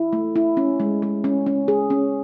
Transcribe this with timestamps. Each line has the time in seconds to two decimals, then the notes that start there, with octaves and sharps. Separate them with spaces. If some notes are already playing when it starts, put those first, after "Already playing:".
Already playing: E4
0.13 A3
0.36 E4
0.57 C#4
0.80 G#3
1.02 G#3
1.24 C#4
1.46 C#4
1.68 G#4
1.90 C#4